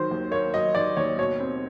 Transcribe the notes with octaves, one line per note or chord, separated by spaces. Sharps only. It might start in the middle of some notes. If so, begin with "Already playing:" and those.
Already playing: D#3 F#3 C5
D#2
A#3 C#5
F#3 D#5
D#3 D5
D#2 C#5
B2 C#5
C4